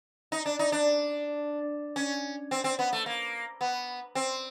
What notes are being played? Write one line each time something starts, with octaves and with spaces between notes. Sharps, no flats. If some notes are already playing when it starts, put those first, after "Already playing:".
D#4
D4
D#4
D4
C#4
C4
C4
B3
A3
A#3
B3
C4